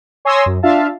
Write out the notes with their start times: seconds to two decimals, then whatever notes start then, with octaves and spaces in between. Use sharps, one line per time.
0.25 C#5 G#5 C6 D#6 E6 A#6
0.46 F#2
0.63 D4 F4 E5 F5 A5